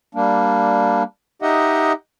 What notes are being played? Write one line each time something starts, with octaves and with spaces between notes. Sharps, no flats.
G3 A#3 D4
D#4 G4 D#5 E5 F#5